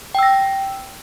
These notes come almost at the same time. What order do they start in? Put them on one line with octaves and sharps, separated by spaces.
G5 E6 A#6